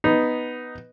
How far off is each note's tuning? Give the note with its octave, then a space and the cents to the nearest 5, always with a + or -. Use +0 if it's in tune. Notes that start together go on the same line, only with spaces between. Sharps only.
B3 +0 D#4 +0